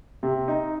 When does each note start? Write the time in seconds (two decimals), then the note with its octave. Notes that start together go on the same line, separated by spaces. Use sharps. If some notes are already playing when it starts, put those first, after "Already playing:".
0.23 C3
0.48 D#4